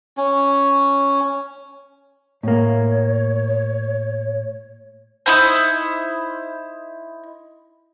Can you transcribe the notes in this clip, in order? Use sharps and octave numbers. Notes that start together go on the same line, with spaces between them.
C#4
A2 A#3 C#5
D#4 E4 C5